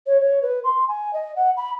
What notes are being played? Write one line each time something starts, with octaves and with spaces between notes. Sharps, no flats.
C#5
C#5
B4
C6
G#5
D#5
F#5
B5